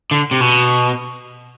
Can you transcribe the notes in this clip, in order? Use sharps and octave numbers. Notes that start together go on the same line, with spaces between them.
D3
C3
B2